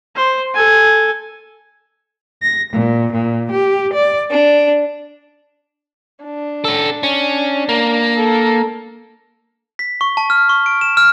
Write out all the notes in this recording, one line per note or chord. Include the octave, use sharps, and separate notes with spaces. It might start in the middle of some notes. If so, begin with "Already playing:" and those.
C5
A4 G#5
A#6
A#2
A#2
G4
D5
D4
D4
C#4 A4
C#4
A#3
A4
B6
C#6
A5
F6
C#6
D7
E7
F6